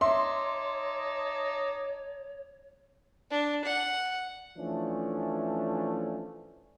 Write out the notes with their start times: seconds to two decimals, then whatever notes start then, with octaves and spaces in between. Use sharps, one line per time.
0.01 D#4 C#5 E5 A5 C6 D6
3.31 D4
3.65 F#5
4.57 E3 F3 A3 C#4 D4